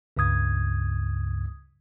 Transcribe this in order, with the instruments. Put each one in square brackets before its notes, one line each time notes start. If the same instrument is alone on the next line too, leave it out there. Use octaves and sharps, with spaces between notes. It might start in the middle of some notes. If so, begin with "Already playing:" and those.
[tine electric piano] C#2 G2 C#3 D#6 G#6